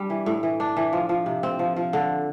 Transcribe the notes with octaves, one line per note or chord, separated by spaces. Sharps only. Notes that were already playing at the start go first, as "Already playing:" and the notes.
Already playing: G3 D4
E3
A2
E3
D4
E3
F3
F3
C3
C4
F3
F3
D3